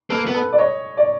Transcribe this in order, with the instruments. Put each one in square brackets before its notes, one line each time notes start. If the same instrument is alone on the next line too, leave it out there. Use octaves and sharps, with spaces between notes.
[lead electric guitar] A#3 [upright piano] A4 B4
[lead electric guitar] B3
[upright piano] A4 B4
D5
C#5 D#5
D5